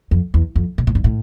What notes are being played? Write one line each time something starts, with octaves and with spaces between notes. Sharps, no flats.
F2
E2
F2
A#2
A2
G2
A2